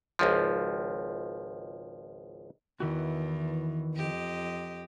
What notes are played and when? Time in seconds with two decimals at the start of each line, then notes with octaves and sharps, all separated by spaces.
0.19 G#1 C#2 F3
2.80 E2 D#3 E3 F#4
3.94 F2 G4 D#5